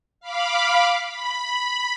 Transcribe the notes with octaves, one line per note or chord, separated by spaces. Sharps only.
F5 B5 D6
B5